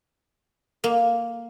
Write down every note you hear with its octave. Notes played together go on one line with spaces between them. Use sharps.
A#3